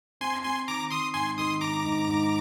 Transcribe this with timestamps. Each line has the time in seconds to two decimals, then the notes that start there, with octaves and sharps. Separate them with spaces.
0.21 C4 G#5 C6
0.44 C4 G#5 C6
0.68 D#3 A#5 D6
0.90 D#3 C6 D#6
1.14 G#2 G#5 C6
1.37 D#3 C6 D#6
1.61 G#2 A#5 D6
1.85 G#2
2.08 G#2